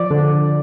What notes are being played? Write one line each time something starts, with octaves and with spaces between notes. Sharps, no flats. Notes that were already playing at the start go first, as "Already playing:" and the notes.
Already playing: F3 D5
D3